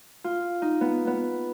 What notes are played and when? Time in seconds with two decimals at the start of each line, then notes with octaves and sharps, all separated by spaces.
0.24 F4
0.62 D#4
0.81 B3
1.07 B3